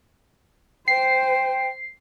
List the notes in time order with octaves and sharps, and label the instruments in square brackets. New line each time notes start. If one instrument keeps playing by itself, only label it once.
[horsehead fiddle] C5 [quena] G5 [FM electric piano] C7